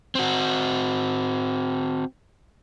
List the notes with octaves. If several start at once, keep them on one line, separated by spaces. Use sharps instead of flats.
C4 F#4